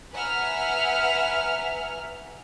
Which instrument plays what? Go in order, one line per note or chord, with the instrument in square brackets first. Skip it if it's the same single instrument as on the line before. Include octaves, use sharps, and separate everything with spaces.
[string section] B4 E5 F#5 G#5 A#5 F6